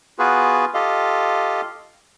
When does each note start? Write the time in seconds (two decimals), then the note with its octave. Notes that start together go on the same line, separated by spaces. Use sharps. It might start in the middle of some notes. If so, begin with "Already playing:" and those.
0.19 B3 F4 F#4 G#4 B4
0.74 F4 G4 A4 D#5 F5